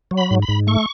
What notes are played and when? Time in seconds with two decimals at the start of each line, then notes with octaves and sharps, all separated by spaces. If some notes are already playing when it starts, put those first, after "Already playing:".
0.11 F#3
0.17 B5
0.31 G#2
0.42 B5
0.48 G#2
0.67 A3 C#6